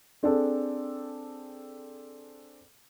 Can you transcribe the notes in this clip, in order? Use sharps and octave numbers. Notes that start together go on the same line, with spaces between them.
C4 D4 G#4 A4